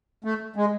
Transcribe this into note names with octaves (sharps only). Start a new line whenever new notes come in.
A3
G#3